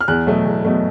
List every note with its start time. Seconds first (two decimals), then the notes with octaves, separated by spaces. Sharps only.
0.01 F6
0.08 E2 F#6
0.27 B2 F#3 A3
0.45 E2
0.65 B2 F#3 A3